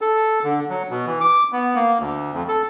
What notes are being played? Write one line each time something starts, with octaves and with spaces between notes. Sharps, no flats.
A4
D3
F#3
B2
E3
D6
B3
A#3
D2
F2
A4